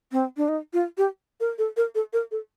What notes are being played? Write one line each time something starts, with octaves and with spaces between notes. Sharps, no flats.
C4
D4
D#4
F4
G4
A#4
A4
A#4
A4
A#4
A4